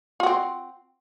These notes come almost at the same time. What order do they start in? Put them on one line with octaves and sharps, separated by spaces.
F4 F#4 C4